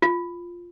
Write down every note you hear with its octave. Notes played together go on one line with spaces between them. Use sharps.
F4